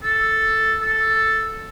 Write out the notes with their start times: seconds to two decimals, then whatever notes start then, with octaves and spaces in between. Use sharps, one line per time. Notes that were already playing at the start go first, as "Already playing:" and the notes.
0.03 A4
0.81 A4